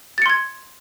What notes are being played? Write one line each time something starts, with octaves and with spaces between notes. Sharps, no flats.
C6 G#6 A6 C#7